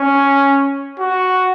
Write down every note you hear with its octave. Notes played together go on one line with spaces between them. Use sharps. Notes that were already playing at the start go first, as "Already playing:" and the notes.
Already playing: C#4
F#4